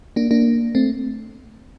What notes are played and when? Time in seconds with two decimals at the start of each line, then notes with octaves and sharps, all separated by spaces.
0.16 A#3 D4
0.31 A#3 D4
0.75 A3 C4